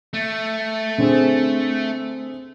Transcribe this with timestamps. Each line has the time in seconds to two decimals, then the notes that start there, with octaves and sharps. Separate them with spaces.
0.14 A3
0.98 D3 C4 G#4